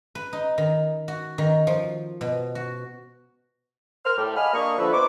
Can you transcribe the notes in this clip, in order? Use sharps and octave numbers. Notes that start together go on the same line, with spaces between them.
B4
D#4
D#3
F#4
D#3
F3
B2
F#4
A#4 C5 F6
A2 G3
D#5 F5 F#5 G#5 B5 F6
A#3 D4 D#5 C#6
D3 F3 B4 E5
B3 D#4 C5 C#6 D6